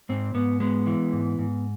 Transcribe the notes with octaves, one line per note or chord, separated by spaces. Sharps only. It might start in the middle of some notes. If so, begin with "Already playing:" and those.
G#2 C4
G#2 B3
G#3 B3
E3
G#2
G#2